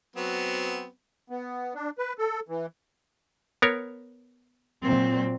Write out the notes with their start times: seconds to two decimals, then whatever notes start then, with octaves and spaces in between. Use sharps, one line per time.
0.16 F#3 B3 C4
1.30 B3
1.75 D4
1.98 B4
2.18 A4
2.49 E3
3.62 B3 A#4 C#5
4.83 A#2 F#3 C4